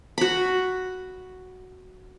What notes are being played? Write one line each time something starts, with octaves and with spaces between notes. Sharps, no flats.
F#4 B5